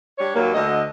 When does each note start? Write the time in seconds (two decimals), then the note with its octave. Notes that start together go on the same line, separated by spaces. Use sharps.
0.19 G3 D4 C#5
0.35 D#2 F#3 A#3
0.54 D2 D3 D#5